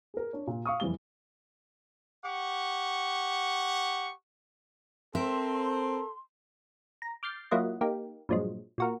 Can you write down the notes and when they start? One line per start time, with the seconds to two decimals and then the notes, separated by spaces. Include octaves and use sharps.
0.14 G#4 A#4
0.33 D4 C#5
0.47 A#2
0.66 F5 C#6 D#6
0.80 F2 E3 G3 G7
2.26 G4 F#5 C#6
5.15 C4 A4 A#4 E5 C6
7.02 A#5
7.23 D6 F6 G6 A6 C7
7.51 F#3 A#3 E4 F4 D#5 F#5
7.81 A#3 D#4 G4
8.29 G2 A#2 F3 F#3 G#3
8.78 A#2 F#4 A#4